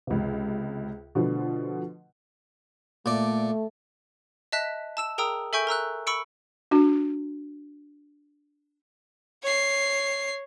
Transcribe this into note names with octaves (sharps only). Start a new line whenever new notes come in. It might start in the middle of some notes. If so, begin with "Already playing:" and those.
C#2 C3
B2 D3 F3 A3
A#2 A3 D5
D#5 E5 A5 F#6 B6
A5 E6 E7
G#4 A#4 G5 A#5 D#6 E6
A4 E5 G#5 C#6 G6 D7
A#4 A#5 E6 F#6
B5 C#6 E6 C#7 D7
D4 F#4
C#5 C7